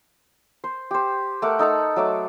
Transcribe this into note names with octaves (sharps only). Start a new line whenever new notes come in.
C5
G4 C5
A3 A#4 F#5 D6
D#4 A4 F#5 A#5
F#3 A3 D6